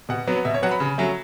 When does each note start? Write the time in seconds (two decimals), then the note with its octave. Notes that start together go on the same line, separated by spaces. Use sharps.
0.09 B2 F#5
0.27 F#3 B3
0.45 B2 E5
0.54 C#5
0.62 F#3 B3 F#5
0.71 B5
0.80 C#3
0.98 F#3 A3 C#4